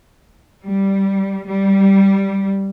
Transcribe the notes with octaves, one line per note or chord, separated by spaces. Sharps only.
G3
G3